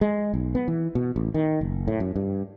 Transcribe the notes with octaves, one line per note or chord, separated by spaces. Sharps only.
G#3
B1
B3
E3
B2
A1
D#3
F#1
A2
F#2
G2